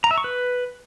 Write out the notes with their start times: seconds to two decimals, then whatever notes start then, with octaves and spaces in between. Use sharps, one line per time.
0.04 A#5
0.11 E5
0.18 C#6
0.24 B4